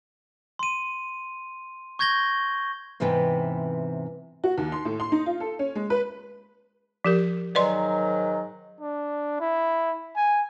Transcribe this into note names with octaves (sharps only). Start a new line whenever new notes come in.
C6 D#7
C#6 G6 G#6 A#6 G7
G#2 C3 E3 B3 B4 G5
F#4
D#2
C6
A2
C6
D#4
F4
A4
C#4
G#3
B4
F3 G4 A#4
G#2 D#3 F#3 B4 D5 C6
D4
E4
G#5